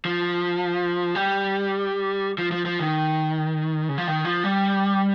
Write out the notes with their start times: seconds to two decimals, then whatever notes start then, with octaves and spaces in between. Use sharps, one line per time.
0.05 F3
1.15 G3
2.38 F3
2.52 F3
2.65 F3
2.80 D#3
3.89 C#3
3.98 F3
4.07 D#3
4.25 F3
4.44 G3